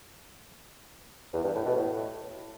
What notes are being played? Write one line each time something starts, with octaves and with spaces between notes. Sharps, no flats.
E2
G2
A2
B2
A2